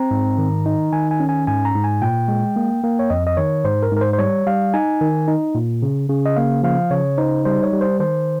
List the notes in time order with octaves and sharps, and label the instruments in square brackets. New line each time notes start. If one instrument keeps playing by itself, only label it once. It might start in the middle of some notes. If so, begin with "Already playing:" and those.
Already playing: [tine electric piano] C4 A#5
G#2
D#3
D#4
D#3 G#5
G#5
C#4
G#5
G#2 G#5
A#5
G#2
G#5
A#2 G5
G#3
A#3
A#3
C#5
F2 D#5
D#5
D#3 C#5
G#2 C5
A#4
G#2
A#4
C5
C5
G3 C#5
G3 F5
D#4 G#5
D#3
D#4
A#2
C#3
C#3
D#5
A#3 F5
F3 F5
C#3 C#5
D#4 C5
G3 C5
C#5
G3
C5
D#3 C5